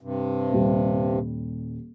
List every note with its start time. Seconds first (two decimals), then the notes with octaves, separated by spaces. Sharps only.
0.01 G2 C3
0.52 D#1 G3